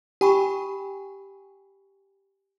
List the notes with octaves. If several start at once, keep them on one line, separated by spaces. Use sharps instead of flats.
G4 G5 G#5 B5 C#6